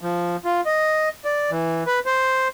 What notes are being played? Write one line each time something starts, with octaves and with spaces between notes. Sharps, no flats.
F3
F4
D#5
D5
E3
B4
C5